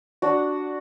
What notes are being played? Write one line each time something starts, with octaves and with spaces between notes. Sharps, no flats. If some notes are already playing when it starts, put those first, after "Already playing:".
D4 F#4